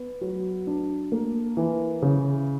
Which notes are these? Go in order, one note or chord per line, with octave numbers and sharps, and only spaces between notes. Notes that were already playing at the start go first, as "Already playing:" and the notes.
Already playing: B3
F#3
D4
A#3
E3
C#3